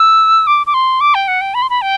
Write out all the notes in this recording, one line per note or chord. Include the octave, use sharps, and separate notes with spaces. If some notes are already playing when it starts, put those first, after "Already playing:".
Already playing: E6
D6
D6
C6
D6
G5
F#5
G5
B5
C6
B5
G5